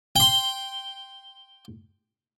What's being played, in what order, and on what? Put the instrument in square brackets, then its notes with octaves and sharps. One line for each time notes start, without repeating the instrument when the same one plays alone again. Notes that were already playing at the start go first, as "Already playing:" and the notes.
[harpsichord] G5 C6